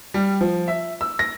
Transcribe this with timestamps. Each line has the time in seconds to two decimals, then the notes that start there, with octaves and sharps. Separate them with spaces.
0.14 G3
0.41 F3
0.68 E5
1.01 E6
1.19 A#6